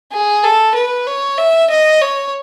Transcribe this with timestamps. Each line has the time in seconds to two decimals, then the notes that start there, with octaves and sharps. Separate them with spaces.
0.12 G#4
0.43 A4
0.75 B4
1.07 C#5
1.38 E5
1.70 D#5
2.01 C#5